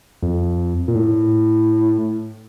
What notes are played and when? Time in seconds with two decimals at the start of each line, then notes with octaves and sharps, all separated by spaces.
0.22 F2
0.88 A#2
0.95 A2